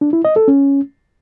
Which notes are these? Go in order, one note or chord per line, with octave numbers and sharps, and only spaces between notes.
D4
E4
D#5
A4
C#4